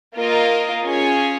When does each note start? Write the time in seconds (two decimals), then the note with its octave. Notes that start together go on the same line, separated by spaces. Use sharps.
0.16 A#3 F4 A#4 D#5
0.86 C#4 F4 G#4 C#5 G#5